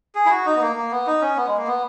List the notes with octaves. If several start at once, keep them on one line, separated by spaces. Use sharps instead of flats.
G#4
E4
F#4
D#4
B3
A#3
A#3
B3
D#4
C#4
B3
G#3
A#3
B3